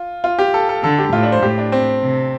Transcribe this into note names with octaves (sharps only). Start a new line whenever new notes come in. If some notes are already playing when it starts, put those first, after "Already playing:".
Already playing: F4
F4
G4
A4
A4
D3 A4
G4
A2 F4
D4
C5
A2 G4
D4
C4
C3